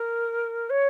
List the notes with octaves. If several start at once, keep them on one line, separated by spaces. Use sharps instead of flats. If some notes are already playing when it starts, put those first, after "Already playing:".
Already playing: A#4
C#5